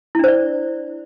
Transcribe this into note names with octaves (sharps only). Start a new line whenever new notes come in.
D4 E4 C5 D5